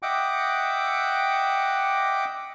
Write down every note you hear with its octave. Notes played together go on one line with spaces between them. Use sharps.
D#5 E5 F#5 G5 D6